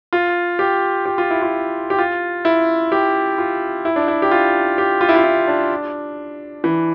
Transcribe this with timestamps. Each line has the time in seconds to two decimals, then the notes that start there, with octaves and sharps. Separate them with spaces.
0.13 F4
0.59 G4
1.06 G4
1.18 F4
1.30 E4
1.42 F4
1.90 G4
1.99 F4
2.45 E4
2.92 G4
3.38 F4
3.85 E4
3.96 D4
4.08 E4
4.22 G4
4.31 F4
4.78 G4
5.01 F4
5.09 E4
5.15 F4
5.24 E4
5.48 D4
6.64 E3